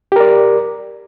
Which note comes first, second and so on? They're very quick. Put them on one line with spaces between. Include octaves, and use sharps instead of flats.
G4 A#4 D5